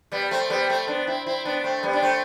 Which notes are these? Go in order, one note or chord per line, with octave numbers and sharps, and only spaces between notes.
G3 B3
A3 C4
G3 B3
A3 C4
B3 D4
C4 E4
C4 E4
B3 D4
A3 C4
G3 B3
D4
A3 C4